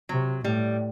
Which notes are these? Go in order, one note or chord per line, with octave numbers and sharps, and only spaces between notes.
C3 F#3
A2 G3